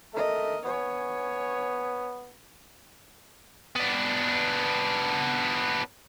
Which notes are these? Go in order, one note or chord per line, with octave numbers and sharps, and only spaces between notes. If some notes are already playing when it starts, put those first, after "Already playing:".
A3 A#4 D#5
B3 C#5 G#5
B3 D4